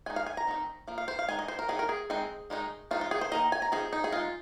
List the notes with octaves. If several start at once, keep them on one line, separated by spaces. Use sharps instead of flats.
G#3 D#4 G#5
F5
G#5
A#5
D#3 C4 D#4
F3 A#3
F5
C5
F5
G#3 D#4 G#5
D#5
C5
A#4
D#3 C4 D#4 G#4
A#4
G#4
G#3 C4 D#4
D#3 G#3 C4 D#4
F3 G#3 D#4 F4
F4
G#4
C5
D#3 A#3 D#4 D#5
G#5
A#5
F3 C4 D#4 G#4
D#4
G#4
G#3 D#4 F4